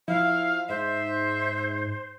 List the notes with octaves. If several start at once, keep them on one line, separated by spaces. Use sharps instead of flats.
F3 E4 F5
G#2 C5 E5